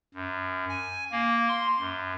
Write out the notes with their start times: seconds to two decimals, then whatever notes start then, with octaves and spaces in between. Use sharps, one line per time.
0.15 F#2
0.69 G#5
1.11 A#3
1.49 C6
1.79 F#2